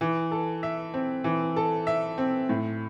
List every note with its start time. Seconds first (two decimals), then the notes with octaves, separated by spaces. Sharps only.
0.01 E3
0.31 A4
0.63 E5
0.94 C4
1.24 E3
1.56 A4
1.87 E5
2.18 C4
2.49 A2